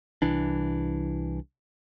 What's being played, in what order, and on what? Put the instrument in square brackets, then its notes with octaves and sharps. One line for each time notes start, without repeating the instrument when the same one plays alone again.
[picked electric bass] C2 E3 D4